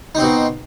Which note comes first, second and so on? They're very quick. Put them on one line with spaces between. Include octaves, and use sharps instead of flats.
D#4 C4 B2